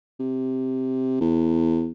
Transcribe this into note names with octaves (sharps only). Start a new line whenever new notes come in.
C3
E2